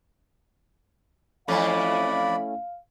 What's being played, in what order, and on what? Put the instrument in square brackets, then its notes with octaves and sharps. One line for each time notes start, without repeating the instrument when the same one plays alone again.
[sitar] F2 E3 [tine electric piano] A3 C#4 E4 [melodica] D5 B5 [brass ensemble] F5